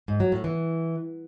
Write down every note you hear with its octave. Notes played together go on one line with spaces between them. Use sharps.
G#2
F#3
A2
E3